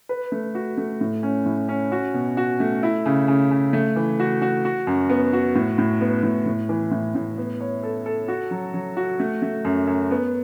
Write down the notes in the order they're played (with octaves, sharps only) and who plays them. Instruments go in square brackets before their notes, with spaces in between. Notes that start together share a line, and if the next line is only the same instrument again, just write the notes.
[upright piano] B4
A3
F#4
A3
A2
C#4
A2
C#4
F#4
B2
F#4
A3
E4
C#3
C#3
C#3
A3
E3
F#4
F#4
F#4
F#2
B3
F#4
A2
A2
B3
A2
A2
E3
A2
A2
B3
C#5
A4
A4
F#4
F#3
F#3
F#4
A3
A3
F#2
F#2
B3